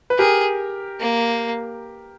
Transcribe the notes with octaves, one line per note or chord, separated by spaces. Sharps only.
B4
G4 G#4 A#4
A#3